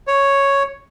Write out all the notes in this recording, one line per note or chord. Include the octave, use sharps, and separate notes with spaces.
C#5